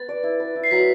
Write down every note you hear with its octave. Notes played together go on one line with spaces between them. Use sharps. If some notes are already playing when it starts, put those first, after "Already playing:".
Already playing: B3 B4 A6
D5
E4
B4
E4
C7
F#3 B6